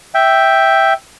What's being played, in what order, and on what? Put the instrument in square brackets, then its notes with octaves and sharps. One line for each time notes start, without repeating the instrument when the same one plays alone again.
[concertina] E5 G5